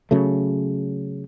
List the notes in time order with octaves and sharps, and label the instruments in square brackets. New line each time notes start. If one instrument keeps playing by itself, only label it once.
[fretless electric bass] C#3 F#3 A3